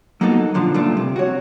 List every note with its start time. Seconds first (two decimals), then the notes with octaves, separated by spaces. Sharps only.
0.21 F#3 A#3 B3 D#4 F#4 A4
0.54 A#2 D3 F3
0.74 G2 A#2 A3 D4
0.97 C3
1.16 F#4 C#5